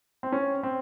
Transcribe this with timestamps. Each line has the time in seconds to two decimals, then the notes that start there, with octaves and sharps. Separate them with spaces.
0.23 C4
0.32 C#4
0.63 C4